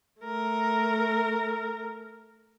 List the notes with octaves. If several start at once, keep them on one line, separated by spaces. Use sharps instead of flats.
A3 A#4